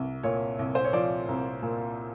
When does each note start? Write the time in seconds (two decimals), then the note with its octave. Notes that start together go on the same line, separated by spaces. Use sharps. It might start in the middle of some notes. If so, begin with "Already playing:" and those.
Already playing: C2
0.23 A#2 C#5
0.59 C2
0.75 C5
0.84 C#5
0.93 F3 D5
1.28 C2
1.62 A#2